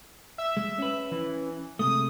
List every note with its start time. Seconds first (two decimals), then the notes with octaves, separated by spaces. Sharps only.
0.38 E5
0.57 G#3
0.78 C#4 B4
1.12 E3
1.79 C3 G#3 A3 D#6